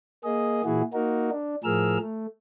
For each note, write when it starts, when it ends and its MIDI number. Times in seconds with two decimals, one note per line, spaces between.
0.24 0.62 58
0.24 0.62 68
0.24 0.62 75
0.65 0.82 46
0.65 0.82 52
0.65 0.82 64
0.65 0.82 66
0.65 0.82 68
0.93 1.30 58
0.93 1.30 63
0.93 1.30 66
0.93 1.30 70
1.31 1.55 62
1.64 1.98 45
1.64 1.98 53
1.64 1.98 68
1.64 1.98 70
1.64 1.98 88
1.64 1.98 89
2.00 2.27 57